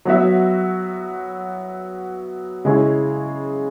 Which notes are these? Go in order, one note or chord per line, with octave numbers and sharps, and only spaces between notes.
F#3 B3 F#4 E5
C#3 G#3 E4 G#4 C#5